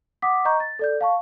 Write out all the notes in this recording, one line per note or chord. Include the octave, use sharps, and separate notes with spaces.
F#5 D6 D#6 B6
D#5 A#5 C#6 G6
A6
A4 D5 G6
F5 A5 C#6